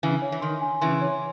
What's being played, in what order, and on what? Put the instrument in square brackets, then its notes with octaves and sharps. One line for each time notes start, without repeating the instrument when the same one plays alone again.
[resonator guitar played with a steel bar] C#3 E3 [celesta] G#5
[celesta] C#5
[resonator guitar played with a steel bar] E3
[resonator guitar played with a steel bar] D#3 [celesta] C6
[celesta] G#5
[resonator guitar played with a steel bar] C#3 E3 [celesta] C6
[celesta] C#5